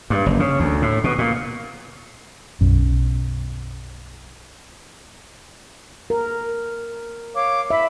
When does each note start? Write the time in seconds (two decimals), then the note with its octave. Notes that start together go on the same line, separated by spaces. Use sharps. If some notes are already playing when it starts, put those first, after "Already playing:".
0.10 G2
0.26 F#1
0.40 C#3
0.60 D2
0.82 A2
1.04 B2
1.18 A#2
2.61 B1 F#2
6.10 A#4
7.34 C#5 F5 D6
7.70 E5 B5